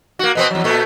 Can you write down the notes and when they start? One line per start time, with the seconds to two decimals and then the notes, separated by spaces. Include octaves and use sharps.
0.19 A#3 F#4
0.35 B2 B3 C4
0.51 E2 F#3
0.64 A#2 A3